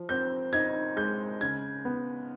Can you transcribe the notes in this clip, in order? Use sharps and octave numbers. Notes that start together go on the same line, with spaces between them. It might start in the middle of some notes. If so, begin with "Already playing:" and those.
Already playing: F3
C4 G6
D#4 G#6
G#3 G6
C#3 G#6
B3